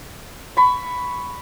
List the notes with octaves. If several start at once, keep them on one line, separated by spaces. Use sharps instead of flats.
B5 C#6